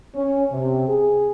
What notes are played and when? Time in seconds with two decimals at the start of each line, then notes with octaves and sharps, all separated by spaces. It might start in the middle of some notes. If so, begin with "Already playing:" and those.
0.15 C#4
0.52 C3
0.88 G#4